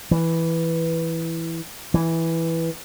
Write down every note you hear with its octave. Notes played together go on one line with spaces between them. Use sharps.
E3
E3